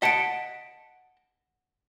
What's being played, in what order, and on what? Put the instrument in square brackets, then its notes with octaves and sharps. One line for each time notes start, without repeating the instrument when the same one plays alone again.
[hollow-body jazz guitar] D#5 F#5 A5 [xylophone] B6 C#7 D7